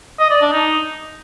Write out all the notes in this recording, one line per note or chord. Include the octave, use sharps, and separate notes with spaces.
D#5
D5
D4
D#4